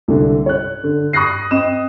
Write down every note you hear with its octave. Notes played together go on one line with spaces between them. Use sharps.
C2 D3
C#5 F#6
D3
C#6 D#6 F#6 A#6 C7
C4 D#5 D#6 E7